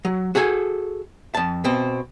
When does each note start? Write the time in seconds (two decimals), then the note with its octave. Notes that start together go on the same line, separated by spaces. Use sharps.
0.05 F#3
0.35 F#4 G#4 A4 G#5
1.35 F2 A5
1.65 B2 C4